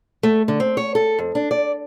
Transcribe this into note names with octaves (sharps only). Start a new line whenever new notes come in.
A3
D3
C4
C#5
A4
F2
D4
D5